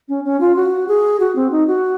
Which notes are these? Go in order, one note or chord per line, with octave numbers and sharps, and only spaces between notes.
C#4
C#4
F4
F#4
G#4
F#4
C4
D#4
F#4